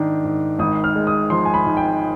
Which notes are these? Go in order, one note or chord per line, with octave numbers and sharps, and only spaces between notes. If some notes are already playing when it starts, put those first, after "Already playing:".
Already playing: G#2 D#3 D4
G#2
G#1 D#6
F6
G#3
D#6
F3 C6
G#5
B5
G#2
G5